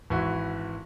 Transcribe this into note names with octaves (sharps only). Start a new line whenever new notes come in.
G#1 E3 E4 F#4